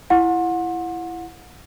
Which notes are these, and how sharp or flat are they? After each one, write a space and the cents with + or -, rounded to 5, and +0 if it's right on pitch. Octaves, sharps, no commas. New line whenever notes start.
E4 +20 F#5 -30 C6 +30